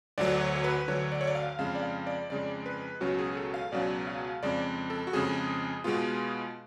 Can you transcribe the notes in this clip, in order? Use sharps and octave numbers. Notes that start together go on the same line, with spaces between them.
D2 D3 F#3 D5
C#5
C#5
B4
D2 D3 F#3 C#5
D5
C#5
D5
F5
F2 C#3 G#3 F5
D5
F5
D5
F2 C#3 G#3 D5
B4
C#2 B2 F#3 C#4 F#4
G#4
A4
F5
C#2 B2 F#3 C#4 D5
F5
F2 C#3 G#3 D5
A4
F#4
F2 C#3 G#3 G#4
B2 G#3 B3 F4